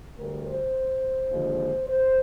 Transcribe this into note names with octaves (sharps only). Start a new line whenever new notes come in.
D2 D3 G3 A#4
C5
D#2 D3 F3 G#3
C5